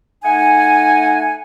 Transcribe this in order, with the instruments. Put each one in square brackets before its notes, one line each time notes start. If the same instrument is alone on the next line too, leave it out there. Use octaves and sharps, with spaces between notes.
[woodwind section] A3 D#4 F#5 G#5